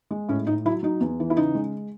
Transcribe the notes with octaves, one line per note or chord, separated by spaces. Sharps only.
G#3
A2 C#4
A2 D#4
F#3 E4
F#3 D#4
E2
E3
E4
C#3 D#4
G#3